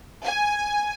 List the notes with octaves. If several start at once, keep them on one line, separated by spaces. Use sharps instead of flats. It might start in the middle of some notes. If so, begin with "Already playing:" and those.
G#5